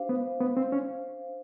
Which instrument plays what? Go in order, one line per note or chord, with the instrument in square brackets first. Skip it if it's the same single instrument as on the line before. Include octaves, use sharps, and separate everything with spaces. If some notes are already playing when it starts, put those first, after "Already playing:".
Already playing: [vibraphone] D4 G4 C5 F5
[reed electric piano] B3
B3
C4
C#4